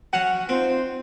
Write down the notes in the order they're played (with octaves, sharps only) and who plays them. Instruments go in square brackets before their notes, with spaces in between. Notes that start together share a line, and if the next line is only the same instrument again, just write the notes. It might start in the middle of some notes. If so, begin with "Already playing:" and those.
[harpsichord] F#3 C#4 [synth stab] F#5
[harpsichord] C4 [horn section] D#4 F4 C5